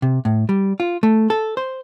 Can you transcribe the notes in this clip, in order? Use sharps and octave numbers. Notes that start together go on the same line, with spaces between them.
C3
A2
G3
F4
A3
A4
C5